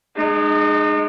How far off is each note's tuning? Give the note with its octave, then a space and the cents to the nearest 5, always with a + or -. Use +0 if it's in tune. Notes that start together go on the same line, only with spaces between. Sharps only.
G#3 +0 D#4 -40